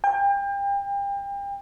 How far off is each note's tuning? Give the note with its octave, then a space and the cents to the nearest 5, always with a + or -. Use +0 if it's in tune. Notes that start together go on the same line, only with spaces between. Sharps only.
G5 +35